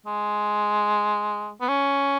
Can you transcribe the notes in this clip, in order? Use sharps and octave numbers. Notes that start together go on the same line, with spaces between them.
G#3
B3
C#4